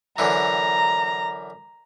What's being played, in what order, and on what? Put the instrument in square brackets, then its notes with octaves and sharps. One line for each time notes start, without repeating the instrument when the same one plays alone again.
[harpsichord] F#2 D3 E3 [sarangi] A#5